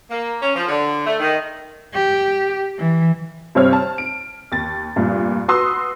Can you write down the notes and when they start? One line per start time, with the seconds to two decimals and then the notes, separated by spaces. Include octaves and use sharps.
0.09 A#3
0.42 C#4
0.54 F3
0.68 D3
1.06 A3
1.19 D#3
1.94 G4
2.78 E3
3.55 G2 C3 C4 C5 C#5 F6
3.73 A5
3.98 D7
4.52 D#2 A6
4.96 F1 G2 A#2
5.48 F#4 B4 C6 D#6 E6